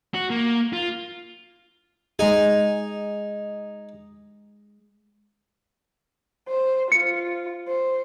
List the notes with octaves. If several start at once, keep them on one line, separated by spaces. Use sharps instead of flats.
F#4
A#3
F4
G#3 D#4 G#4 G#5
C5
F4 C#7
C5